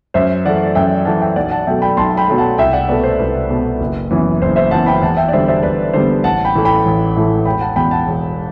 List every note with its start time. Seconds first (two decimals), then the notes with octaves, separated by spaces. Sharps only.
0.14 F#2 C5 E5
0.45 E3 A3 D5 F#5
0.75 F#2 E5 G5
1.05 E3 A3 F#5 A5
1.21 E5 G5
1.36 B1 D5 F#5
1.51 F#5 A5
1.67 B2 F#3 A3 E5 G5
1.82 G5 B5
1.97 B1 A5 C6
2.17 G5 B5
2.28 B2 F#3 A3
2.38 F#5 A5
2.58 C2 E5 G5
2.73 D5 F#5
2.88 B2 A3 B4 D5
3.04 C5
3.19 C2 B4
3.49 B2 A3
3.80 F#1
4.11 F#2 E3 B3
4.42 F#1 C5
4.56 C5 E5
4.71 F#2 E3 B3 F#5 A5
4.86 G5 B5
5.02 E2 F#5 A5
5.17 E5 G5
5.28 D5
5.32 D3 G3 B3 C5 E5
5.48 C5 E5
5.63 E2 B4 D5
5.89 B4
5.93 D3 G3 B3 C5
6.24 A1 F#5 A5
6.45 G5 B5
6.55 A2 E3 A3
6.65 G5 B5
6.86 A1
7.16 A2 E3 A3
7.45 E1 G5 B5
7.61 F#5 A5
7.76 E2 B2 G5 B5
7.91 F#5 A5
8.08 E1